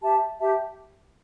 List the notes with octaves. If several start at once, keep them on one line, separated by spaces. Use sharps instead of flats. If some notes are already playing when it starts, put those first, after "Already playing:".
G4 E5 A5
G4 E5 A5